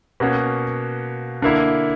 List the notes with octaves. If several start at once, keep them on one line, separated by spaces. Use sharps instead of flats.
B2 A#3 C#4 F#4
D3 A#3 E4